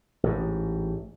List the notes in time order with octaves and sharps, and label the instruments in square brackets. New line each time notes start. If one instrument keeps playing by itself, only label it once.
[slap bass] A1 G#2